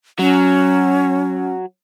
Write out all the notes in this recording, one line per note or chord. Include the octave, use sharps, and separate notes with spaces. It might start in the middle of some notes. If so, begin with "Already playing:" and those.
F#3 C#4